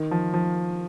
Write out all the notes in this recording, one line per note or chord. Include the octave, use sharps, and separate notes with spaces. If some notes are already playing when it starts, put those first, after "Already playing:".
Already playing: D#3
F3
F3